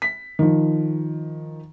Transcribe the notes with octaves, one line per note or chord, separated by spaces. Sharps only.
B6
D#3 F3